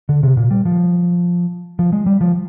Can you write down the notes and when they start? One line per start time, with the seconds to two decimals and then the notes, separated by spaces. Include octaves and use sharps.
0.09 D3
0.23 C3
0.37 A#2
0.51 G3
0.65 F3
1.79 F3
1.92 G#3
2.06 G3
2.21 F3